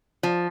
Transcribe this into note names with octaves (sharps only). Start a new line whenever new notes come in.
F3